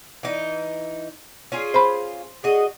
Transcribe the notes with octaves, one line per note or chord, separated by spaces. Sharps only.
E3 D#4
C#4 F4 G#4
C5 B5
F#4 G#4 D#5